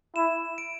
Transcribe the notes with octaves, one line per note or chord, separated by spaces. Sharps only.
E4 E7
D7